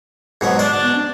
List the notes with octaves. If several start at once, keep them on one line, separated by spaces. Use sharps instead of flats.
G#2 B2 F#3
D4 D5
B3
D4